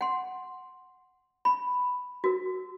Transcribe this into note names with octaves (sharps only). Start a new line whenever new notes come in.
F#5 C6
B5
F#4 A#4